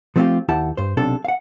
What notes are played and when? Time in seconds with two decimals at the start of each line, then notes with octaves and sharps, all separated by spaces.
0.16 F3 A3 C4 D#4 F4 G4
0.49 D#2 E4 G4 F#5 A5
0.77 G2 C5
0.97 B1 C3 D4 A4
1.25 F5 F#5